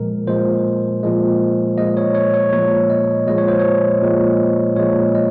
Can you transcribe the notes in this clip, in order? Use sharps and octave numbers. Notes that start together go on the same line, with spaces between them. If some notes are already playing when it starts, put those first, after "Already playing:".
Already playing: A#2 F3 G#3 A#4
A#2 F3 G#3 C5
A#2 F3 G#3
A#2 F3 G#3 D#5
C#5
C#5
C#5
A#2 F3 G#3 C#5
D#5
A#2 F3 G#3 D#5
C#5
C5
C#5
A#2 F3 G#3
A#2 F3 G#3 C#5
D#5